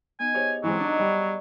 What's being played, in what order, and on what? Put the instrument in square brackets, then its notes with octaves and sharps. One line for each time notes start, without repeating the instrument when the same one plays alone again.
[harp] B3 D#4 [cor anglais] G#5
[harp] D#4 G4 G#4 [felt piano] C5 C#5
[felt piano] E3 G#3 C4 [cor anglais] F#3
[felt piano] D4 D#4 [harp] D5 D#5 C#6
[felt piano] G3